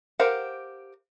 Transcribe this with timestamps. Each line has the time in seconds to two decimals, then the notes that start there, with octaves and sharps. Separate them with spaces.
0.19 G4 A#4 C5 F5 F#5